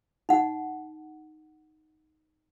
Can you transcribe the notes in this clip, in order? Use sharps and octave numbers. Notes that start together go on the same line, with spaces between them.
D#4 F#5